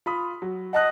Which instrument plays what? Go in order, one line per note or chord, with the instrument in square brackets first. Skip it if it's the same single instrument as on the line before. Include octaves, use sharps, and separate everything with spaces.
[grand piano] F4 B5 D#6
F#3
[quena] D#5 [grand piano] F#5 A5 F#6